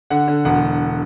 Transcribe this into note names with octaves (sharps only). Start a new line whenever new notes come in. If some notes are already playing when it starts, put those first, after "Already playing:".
D3 F#5
D3
E1 F#5